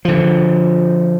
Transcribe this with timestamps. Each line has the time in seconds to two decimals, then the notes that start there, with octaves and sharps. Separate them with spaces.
0.05 D3 F3